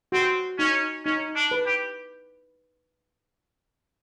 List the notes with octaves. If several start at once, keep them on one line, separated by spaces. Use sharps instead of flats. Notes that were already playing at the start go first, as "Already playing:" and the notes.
C4 F#4
C#4 D#4
C#4 D#4
D4
B4
G4